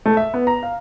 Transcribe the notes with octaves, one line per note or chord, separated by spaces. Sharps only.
A3
E5
B3
A#5
F5